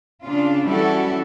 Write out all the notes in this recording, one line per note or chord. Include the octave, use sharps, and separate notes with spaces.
C#3 D4 F4
E3 G3 C#4 E4 F#4 A4